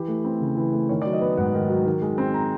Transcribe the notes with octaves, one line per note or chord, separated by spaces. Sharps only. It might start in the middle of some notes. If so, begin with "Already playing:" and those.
Already playing: E3 G4
A3
C4
C#3
E3
A3
D#3 C#5
F#3 D5
D#5
B3
G#2 F#5
D#3
F#3
D#3
G#3
C4
A#5